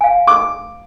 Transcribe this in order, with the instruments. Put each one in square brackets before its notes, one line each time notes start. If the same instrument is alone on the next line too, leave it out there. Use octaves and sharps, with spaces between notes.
[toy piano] F5 G#5
[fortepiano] D6